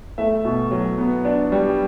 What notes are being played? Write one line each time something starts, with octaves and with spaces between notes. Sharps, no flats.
A3 E5
B2
F#3
B3
D4
G3